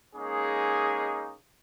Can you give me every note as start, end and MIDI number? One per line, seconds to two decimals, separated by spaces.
0.15 1.35 56
0.15 1.35 58
0.15 1.35 61
0.15 1.35 63
0.15 1.35 68